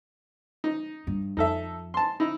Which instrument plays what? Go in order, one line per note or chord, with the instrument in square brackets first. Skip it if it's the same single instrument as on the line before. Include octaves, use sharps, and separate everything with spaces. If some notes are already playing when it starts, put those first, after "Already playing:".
[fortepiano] D#4
[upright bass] G2
[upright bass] F2 [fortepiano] D#4 A4 E5
[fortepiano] A5 C6
D#4 E4